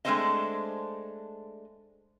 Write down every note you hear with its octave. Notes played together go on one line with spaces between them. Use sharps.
G#3 A3 C4 D4 C5 D#5